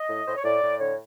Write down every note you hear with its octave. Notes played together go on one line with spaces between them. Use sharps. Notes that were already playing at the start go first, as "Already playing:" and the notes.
Already playing: D#5
A2
A2 C5
C#5
A2 D5
A2
D3 C#5